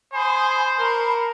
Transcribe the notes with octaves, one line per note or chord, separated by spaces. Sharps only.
C5 G#5 B5 D#6
A#4 A5 B5 C#6